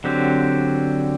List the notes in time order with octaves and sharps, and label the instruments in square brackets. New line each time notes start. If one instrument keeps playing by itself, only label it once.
[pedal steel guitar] D3 F#3 C4 G4